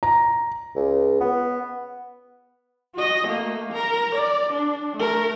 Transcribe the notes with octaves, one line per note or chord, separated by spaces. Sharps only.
A#5
C#2
B3
F#4 D#5
A3 A#3
A#4 A#5
D5
D4
A3 A#4